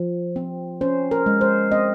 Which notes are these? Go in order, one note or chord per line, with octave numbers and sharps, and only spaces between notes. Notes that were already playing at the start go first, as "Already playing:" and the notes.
Already playing: F3
C4
C#4 C5
A#4
G#3
C5
C4 D#5